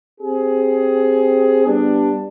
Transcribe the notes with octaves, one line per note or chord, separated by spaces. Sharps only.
C4 G4 G#4
G3 B3 D4